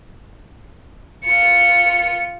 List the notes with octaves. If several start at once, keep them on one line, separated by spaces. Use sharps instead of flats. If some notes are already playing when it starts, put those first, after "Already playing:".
F4 C#7